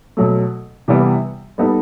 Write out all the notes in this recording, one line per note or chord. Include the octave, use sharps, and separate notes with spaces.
B2 F#3 A3
C3 E3 G3 B3 E4
G3 B3 D#4 A4